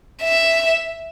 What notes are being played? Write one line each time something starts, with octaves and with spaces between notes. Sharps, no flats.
E5